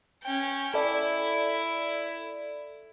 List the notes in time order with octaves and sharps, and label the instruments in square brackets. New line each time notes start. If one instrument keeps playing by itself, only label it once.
[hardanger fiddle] C#4 G5
[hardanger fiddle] E4 [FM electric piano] A4 D5